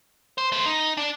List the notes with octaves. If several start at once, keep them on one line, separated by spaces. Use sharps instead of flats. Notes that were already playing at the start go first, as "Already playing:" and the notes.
C5
A3 C5
D#4
D4